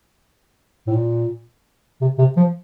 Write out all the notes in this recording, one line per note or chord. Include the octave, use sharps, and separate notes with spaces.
A2
A#2
C3
C3
F3